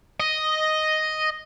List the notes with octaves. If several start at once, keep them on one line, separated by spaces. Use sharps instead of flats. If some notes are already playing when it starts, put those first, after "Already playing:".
D#5